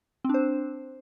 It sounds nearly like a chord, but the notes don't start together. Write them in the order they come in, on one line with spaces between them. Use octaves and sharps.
C4 D4 C5